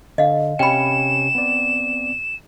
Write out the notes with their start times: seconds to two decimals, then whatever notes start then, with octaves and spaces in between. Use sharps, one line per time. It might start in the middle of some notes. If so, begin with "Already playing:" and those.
0.18 D3 D#5 F5
0.59 C3 C#4 G5 B5 C#7 E7
1.35 B3 C4 D5